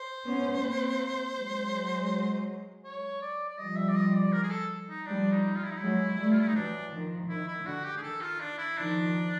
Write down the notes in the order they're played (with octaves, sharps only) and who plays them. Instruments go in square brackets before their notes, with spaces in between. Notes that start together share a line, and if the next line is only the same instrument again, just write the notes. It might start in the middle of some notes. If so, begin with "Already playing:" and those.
Already playing: [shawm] C5
[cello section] B3 C#4
A#3 C4
F#3 G#3
[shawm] C#5
D5
D5
[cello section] F3 G3 [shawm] D#5
[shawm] E5
D5
D#5
D5
A#4
G#4
A4
D#4
[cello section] F3 G3 [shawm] D4
[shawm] D#4
F4
E4
D#4
[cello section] F#3 G#3 [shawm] E4
[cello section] G3 A3
[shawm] F4
E4
D#4
[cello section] E3 F#3 [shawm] D4
[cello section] D#3 F3
[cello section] D#3 [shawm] E4
[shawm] E4
[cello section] D3 [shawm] F#4
[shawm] G4
G#4
[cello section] D#3 [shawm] A4
[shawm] F4
D4
E4
[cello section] D#3 F3 [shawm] D4